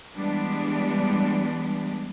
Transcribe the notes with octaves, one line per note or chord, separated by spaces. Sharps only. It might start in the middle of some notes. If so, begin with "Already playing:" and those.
E3 G3 G#3 B3 D4